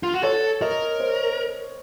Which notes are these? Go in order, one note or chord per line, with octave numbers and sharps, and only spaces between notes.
F4
F#4
A4 C#5
A#4 D#5
C5